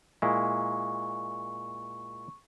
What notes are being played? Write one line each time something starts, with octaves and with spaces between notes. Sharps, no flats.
A#2 G#3 E4 C#6